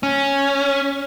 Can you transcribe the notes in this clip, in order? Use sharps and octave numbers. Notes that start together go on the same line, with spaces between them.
C#4